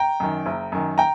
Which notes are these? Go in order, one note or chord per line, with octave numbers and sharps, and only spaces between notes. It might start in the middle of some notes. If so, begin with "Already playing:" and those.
Already playing: G5 A#5
F#2 D#3
F#1
F#2 D#3
G5 A#5